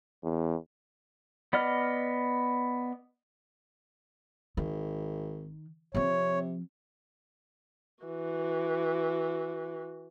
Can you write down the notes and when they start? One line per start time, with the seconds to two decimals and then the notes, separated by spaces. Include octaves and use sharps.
0.24 E2
1.53 B3 D5 D#5 F6
4.57 G#1 D#3
5.95 C3 F3 C4 C#5
8.04 E3 F#4